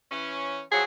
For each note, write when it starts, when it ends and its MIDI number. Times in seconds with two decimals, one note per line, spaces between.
0.12 0.61 52
0.12 0.61 61
0.72 0.84 43
0.72 0.84 53
0.72 0.84 54
0.72 0.84 68